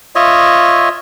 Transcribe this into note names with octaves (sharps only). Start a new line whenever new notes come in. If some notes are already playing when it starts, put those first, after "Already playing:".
F4 C#5 D#5 E5